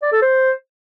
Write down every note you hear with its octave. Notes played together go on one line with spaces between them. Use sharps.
D5
A4
C5